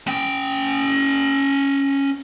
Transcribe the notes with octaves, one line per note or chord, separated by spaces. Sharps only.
C#4 G5